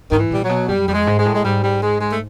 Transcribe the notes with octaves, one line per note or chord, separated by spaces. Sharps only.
G#2 D#3
E3
A#2 G3
F#3
B2
F#2 G3
F2 G3
G#3
G#2
G#3
A2
G#3
G#2 G3
G3
G#3
G#3
A3